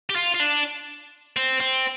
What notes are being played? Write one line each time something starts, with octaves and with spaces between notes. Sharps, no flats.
G4
F4
F4
D4
C4
C4